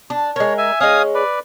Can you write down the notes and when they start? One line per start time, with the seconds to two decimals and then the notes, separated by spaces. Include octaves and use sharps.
0.10 D4
0.36 G#3 A#4 C#5
0.58 E5 G#5
0.80 G#3 C#4 F5 G#5 D#6
1.15 B4 D5